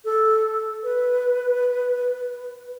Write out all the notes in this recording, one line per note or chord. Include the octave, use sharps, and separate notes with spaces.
A4
B4